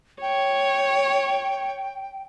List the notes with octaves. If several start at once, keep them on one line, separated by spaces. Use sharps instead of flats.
C#5 G5